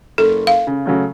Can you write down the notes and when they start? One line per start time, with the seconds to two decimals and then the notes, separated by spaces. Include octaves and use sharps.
0.18 F#1 A4
0.47 F5
0.67 C#3
0.86 C#3 F#3 A3